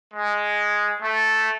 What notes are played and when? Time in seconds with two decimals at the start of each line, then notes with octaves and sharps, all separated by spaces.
0.14 G#3
1.01 A3